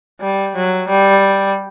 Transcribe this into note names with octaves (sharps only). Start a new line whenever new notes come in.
G3
F#3
G3